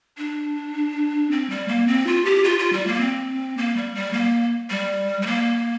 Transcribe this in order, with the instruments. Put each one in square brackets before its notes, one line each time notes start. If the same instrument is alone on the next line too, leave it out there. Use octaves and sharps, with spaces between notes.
[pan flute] D4
C4
G3
A#3
C4
F4
G4
F4
F4
G3
A#3
C4
A#3
G3
G3
A#3
G3
G3
A#3